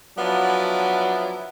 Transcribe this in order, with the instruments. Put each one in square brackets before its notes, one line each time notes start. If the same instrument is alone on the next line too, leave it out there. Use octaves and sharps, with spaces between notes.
[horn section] F3 F#3 B3 D4 E4